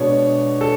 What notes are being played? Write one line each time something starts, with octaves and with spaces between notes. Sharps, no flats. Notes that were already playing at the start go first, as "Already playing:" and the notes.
Already playing: B2 G#3 B3 D4 C#5
A4